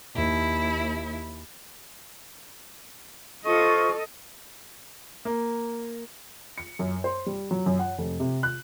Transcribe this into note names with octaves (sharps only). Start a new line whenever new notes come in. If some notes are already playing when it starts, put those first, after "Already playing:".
D#2 E4
F4 A4 C5 D#5 C#6
A#3
C#7
F#2
C5
G3
F#3
F#2
F#5
F1
C3
F#6